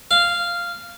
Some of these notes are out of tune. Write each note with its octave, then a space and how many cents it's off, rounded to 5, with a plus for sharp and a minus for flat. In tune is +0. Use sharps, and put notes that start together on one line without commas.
F5 -10